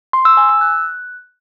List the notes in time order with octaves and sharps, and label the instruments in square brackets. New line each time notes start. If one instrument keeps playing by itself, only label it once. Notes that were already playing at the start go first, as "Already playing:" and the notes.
[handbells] C6
E6
G#5
E6
F#6